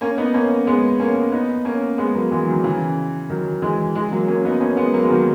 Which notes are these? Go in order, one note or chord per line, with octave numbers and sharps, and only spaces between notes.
A#3 C#4
B3 D#4
A#3 C#4
G#3 B3
A#3 C#4
B3 D#4
A#3 C#4
G#3 B3
F#3 A#3
E3 G#3
D#3 F#3
C#3 E3
D#3 F#3
E3 G#3
E3 G#3
F#3 A#3
A#3 C#4
B3 D#4
A#3 C#4
G#3 B3
F#3 A#3
G#3
D#3 F#3